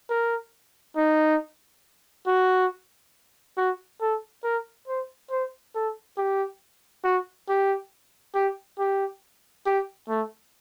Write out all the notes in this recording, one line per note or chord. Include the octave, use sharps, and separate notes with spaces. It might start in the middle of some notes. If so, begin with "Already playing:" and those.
A#4
D#4
F#4
F#4
A4
A#4
C5
C5
A4
G4
F#4
G4
G4
G4
G4
A3